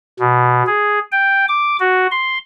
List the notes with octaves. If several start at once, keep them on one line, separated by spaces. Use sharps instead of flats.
B2
G#4
G5
D6
F#4
C6